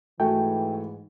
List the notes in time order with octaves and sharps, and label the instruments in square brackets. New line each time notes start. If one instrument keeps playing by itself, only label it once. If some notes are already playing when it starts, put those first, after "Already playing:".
[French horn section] G#2 E3 [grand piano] A3 F#4 G#5 [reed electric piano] G5